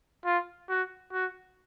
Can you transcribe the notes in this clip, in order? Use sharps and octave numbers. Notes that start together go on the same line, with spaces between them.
F4
F#4
F#4